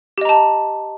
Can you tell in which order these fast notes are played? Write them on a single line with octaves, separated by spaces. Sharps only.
G4 D#5 A#5 A5